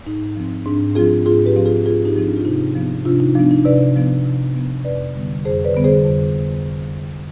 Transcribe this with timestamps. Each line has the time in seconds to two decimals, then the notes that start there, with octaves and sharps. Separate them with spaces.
0.06 G#2 D#4
0.36 F3 C4
0.66 G#2 D4
0.95 F3 C4 F4 G#4
1.26 G#2 F4 G#4
1.46 G4 B4
1.56 F3 C4
1.66 F4 G#4
1.86 G#2 F4 G#4
2.05 D#4 G4
2.16 F3 C4 D#4
2.25 D4 F4
2.36 F4
2.45 C3 D#4
2.75 F3 B3
3.05 C3 D4 F4
3.20 D#4
3.35 F3 B3 D4
3.51 D#4
3.65 C3 B4 D5
3.96 F3 B3
4.25 C3
4.55 F3 B3
4.85 F2 B4 D5
5.14 D3 G3 B3
5.45 F2 G#4 C5
5.65 B4 D5
5.74 D3 G3 B3
5.84 G#4 C5
6.05 F2